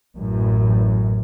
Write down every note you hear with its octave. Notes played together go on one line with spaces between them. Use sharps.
A1 F#2 A2